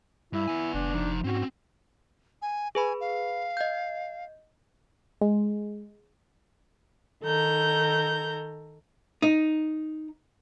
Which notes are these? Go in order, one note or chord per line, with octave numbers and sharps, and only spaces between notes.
G2 E4
B3 G#5
F1 D4
F3 D#4
G#2 C4 C#4 F#4
G#5
G#4 B4 G#5 B5
F5
D#5 G6
G#3
D#3 A4 A#5 G6
D#4